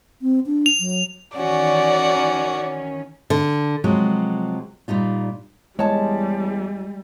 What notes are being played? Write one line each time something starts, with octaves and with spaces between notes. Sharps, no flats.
C4
D4
F7
F#3
D#3 E3 C#4 F#4 D5
D3
C3 F3 F#3 G#3
A#2 G3 D#4 F4
E2 G3 G#3 C#5 A5